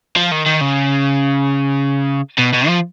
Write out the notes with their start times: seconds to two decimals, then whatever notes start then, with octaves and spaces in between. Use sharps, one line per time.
0.16 F3
0.31 D#3
0.46 D#3
0.61 C#3
2.39 B2
2.54 B2
2.68 F3